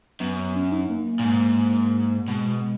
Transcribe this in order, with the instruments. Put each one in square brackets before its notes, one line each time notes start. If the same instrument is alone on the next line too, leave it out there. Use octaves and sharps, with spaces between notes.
[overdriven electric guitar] F#2 [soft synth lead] B3
[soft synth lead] C#4
D#4
A#3
[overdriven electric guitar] A#2
G#2
[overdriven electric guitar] B2 [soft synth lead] G#3